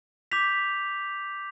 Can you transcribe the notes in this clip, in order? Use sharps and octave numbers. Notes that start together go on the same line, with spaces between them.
D6 G6 B6 F7